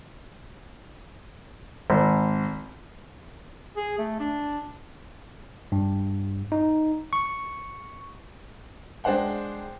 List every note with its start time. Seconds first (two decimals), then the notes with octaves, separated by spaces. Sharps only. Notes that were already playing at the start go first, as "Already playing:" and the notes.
1.90 G#1
3.76 G#4
3.98 A3
4.20 D4
5.72 G2
6.52 D#4
7.13 C#6
9.04 G#3 D4 C5 F#5 G5